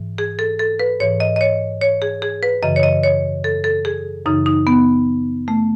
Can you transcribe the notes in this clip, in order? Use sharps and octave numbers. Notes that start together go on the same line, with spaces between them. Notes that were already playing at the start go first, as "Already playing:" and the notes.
Already playing: G#2 E3
G#4
A4
A4
B4
G#2 E3 C#5
D#5
D#5
C#5
C#5
G#4
G#4
B4
F#2 C#3 E3 D#5
C#5
D#5
C#5
A4
A4
G#4
F#2 C#3 E3 D#4
D#4
B3
A3